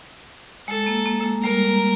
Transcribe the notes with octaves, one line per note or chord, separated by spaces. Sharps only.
G#3 A4
A#3
A#3
G#3
G3 A#4